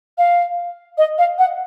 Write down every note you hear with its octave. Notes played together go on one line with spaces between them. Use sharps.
F5
D#5
F5
F#5